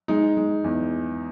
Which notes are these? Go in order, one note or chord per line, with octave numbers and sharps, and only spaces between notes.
G#3 D#4
G#3
E2